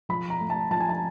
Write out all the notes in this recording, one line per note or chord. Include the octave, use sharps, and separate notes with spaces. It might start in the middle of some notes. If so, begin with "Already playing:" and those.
F3 B5
A#5
A3
A5
F3 A5
G#5
A5